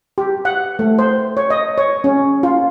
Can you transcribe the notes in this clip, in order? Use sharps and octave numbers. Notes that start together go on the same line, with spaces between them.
G4
F#5
A3
C5
C#5
D#5
C#5
C#4
F4